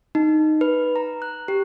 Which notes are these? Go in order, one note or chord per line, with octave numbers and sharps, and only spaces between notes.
D#4
B4
A#5
F#6
G4